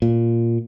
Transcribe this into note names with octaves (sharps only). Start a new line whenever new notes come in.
A#2